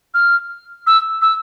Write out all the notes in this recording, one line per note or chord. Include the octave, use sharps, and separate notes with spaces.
F6
E6
E6